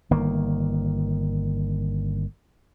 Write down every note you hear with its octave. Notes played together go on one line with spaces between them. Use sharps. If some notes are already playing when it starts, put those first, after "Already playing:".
G1 D#3 A#3